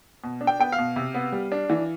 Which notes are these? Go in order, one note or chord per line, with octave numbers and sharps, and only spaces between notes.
B2
D4
G5
B3 G5
F5
B2
C3
B3
G3
D4
E3